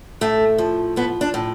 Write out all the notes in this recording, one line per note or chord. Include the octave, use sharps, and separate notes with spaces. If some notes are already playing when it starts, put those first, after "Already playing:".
A2 A3
F3
F3 B3
D4
A2